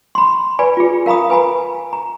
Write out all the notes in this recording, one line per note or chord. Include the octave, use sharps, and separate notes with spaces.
B5 C6
B4 D5 G#5 B5
F4 G#4
A#4 F5 A#5 B5 D#6
B4 G#5 A#5 B5
A#5